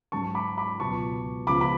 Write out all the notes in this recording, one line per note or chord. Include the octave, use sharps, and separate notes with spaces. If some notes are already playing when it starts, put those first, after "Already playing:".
G#2 F#3 C#4 A5 C#6
B5 D6
B5 D6
C#2 B2 F#3 B3 A5 C#6
C#2 C#3 F3 B3 B5 D6
B5